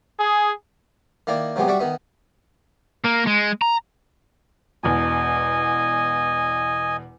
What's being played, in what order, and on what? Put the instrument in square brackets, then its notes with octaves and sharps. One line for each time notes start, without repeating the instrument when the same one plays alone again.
[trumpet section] G#4
[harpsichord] D#3 A#3 E4 D5
C3 F#3 G#3 B3 G4
G3 F#4 D5 E5 F#5
D#3 B3 E5
[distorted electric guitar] A#3
G#3
A#5
[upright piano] E1 E2 [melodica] D#5 G#5